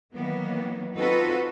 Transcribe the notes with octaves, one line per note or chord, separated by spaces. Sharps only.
D#3 E3 F#3 A#3 B3
C4 D#4 F4 F#4 A4 B4